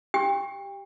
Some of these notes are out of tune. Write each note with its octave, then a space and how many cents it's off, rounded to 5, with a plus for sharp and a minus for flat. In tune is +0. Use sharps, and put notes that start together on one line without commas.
G4 -10 G5 +30 C#6 +0